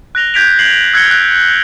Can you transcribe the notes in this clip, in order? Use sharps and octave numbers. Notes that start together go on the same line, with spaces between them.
F#6 A#6 F7 G7
G6 G#6 B6 D7 F7
G#6 C7 F#7
E6 F#6 G#6 A#6 C#7 G7
F#6